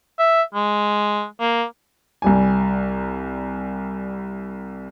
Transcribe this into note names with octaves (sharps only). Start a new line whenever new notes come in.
E5
G#3
A#3
C2 G3 G#5